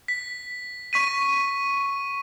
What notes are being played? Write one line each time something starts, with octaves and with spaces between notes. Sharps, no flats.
B6
C#6 B6 D#7